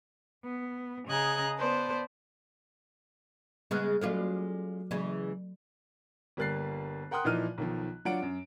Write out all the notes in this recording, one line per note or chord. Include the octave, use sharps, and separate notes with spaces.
B3
C#3 G#4 D#5 A#5 F#6 G#6
B3 B4 C5 D5 A5
C#3 G3 G#3 B3 F6 F#6
F#3 G#3 C#4 F4 F#4 A4
C#3 E3 F#3 G#3
G1 G3 A#3 F#6 A6 C7
A#4 F#5 G5 C6 D#6 F#6
A#2 E3 F3 D#4 F6 D#7
B1 D#3 F3
F#3 D4 F4 F#5 D7
F#2